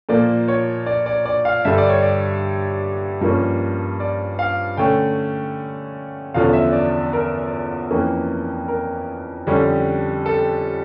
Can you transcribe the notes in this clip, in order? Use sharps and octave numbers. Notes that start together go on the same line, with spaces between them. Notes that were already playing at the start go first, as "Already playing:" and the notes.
A#2 F3 A#3 D5
C#5
D5
D5
D5
F5
G2 D3 G3 D4 E5
D5
C#5
D5
G2 F3 A#3 C#4
D5
F5
D3 A3 C#4 G5
E2 D3 F3 C#4 F5
E5
D5
A#4
F2 E3 A#3 C#4
A#4
F2 D3 G3 C#4
A4